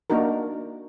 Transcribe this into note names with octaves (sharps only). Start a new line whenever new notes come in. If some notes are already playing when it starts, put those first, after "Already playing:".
A#3 D4 D#4 F#4 A#4